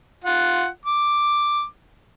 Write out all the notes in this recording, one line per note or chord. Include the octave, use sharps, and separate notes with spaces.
F4 F#5
D6